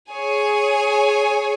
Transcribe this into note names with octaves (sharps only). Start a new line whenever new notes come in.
G#4 C#5 G#5